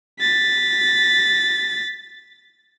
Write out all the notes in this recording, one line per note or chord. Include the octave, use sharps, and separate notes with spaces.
A6 B6